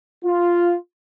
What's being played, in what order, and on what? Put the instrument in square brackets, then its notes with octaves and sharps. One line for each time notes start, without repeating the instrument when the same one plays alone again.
[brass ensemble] F4